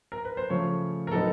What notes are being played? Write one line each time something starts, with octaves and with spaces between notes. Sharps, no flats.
A#4
B4
C5
C#3 F3 A3 C#4 C#5
A#4
A2 F#3 B3 D#4 A4